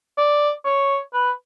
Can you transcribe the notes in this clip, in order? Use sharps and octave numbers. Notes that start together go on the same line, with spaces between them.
D5
C#5
B4